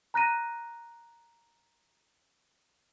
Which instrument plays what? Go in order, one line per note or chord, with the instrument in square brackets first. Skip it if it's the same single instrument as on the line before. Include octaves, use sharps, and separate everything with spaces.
[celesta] A#5 F#6 A#6 D#7